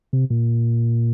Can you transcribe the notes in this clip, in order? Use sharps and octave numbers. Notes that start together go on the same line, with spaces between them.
C3
A#2